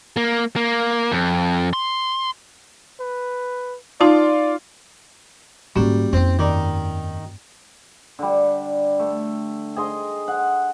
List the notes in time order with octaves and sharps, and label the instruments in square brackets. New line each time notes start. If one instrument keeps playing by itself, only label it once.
[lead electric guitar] A#3
A#3
F2
C6
[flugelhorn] B4
[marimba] D#4 A5 [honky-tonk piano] F4 [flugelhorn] D5
[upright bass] G#2 D3 [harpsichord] G3 [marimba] A#3 C#4 F#4
[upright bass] F2 D#4 [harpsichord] C4
[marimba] G2 D5 D6 [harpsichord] D#3
[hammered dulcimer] D3 G3
A3
G#4 D#5 C6
F#5